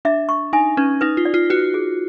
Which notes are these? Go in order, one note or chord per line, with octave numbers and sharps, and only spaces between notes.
D4 E5
C#6
D#4 G#5
C#4 B4
D#4 B4
F4
D5
F4
F#4 B4
G#4